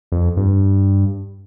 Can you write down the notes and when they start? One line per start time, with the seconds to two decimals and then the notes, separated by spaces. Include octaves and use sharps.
0.12 F2
0.37 G2